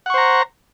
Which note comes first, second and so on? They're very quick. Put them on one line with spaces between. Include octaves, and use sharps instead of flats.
F#5 C#6 C5 A#5